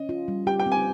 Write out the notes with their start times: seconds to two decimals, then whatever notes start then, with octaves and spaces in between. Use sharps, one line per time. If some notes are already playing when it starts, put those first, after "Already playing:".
Already playing: C#4 D#5
0.09 F4
0.28 G3
0.47 G4 G5
0.60 G5
0.66 C4
0.72 G#5